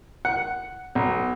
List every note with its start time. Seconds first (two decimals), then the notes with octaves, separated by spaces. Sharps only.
0.25 F#5
0.95 B1